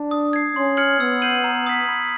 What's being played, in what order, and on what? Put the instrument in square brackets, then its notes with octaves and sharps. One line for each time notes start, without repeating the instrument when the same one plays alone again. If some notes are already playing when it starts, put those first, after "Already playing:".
Already playing: [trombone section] D4
[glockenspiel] D#6
G#6 C7
[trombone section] C#4 [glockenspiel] C6
[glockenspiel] F6 G#6 C#7 F#7
[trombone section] B3 [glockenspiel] E6
[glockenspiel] G6 C7 D#7 F#7
A#5
D#6 G#6 B6
B5